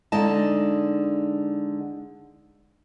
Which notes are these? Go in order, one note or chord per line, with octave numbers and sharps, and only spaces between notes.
D3 G#3 D#4 D#5 A5